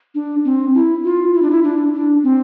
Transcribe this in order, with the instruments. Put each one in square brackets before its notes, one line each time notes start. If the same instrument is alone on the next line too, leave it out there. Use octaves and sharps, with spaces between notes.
[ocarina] D4
C4
E4
F4
E4
D4
E4
D4
D4
C4